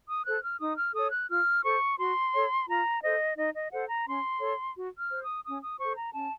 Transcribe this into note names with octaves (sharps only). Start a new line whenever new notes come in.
D#6
A4 C5 F#6
F6
D#4 D#6
F6
A4 C#5 D#6
F#6
F4 F6
A4 C5 C#6
F#4 C6
A4 C#5
F4 A#5
A4 C5 D#5
D#4 D#5
D#5
A4 C5 F#5
A#5
C#4 C6
A4 C#5
F#4
F6
C5
D#6
C#4 D#6
D#6
A4 C5 C#6
A#5
C#4 A5